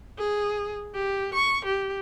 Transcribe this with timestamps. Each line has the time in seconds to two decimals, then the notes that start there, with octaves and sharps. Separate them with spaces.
0.18 G#4
0.94 G4
1.34 C#6
1.65 G4